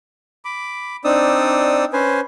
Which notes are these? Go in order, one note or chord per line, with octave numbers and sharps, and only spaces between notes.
B5 D6
C4 D4 D#4 D5 D#6 E6
C#4 B4 C5 G#5